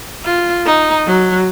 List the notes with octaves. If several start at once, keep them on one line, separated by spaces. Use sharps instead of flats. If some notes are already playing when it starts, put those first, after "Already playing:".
F4
D#4
F#3